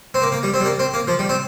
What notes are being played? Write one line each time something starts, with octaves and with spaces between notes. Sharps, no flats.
C4
A#3
A#3
G3
C4
G3
A#3
C4
A#3
F3
G3
C4